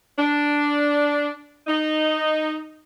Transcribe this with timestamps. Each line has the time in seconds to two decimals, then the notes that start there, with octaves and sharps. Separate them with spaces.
0.18 D4
1.67 D#4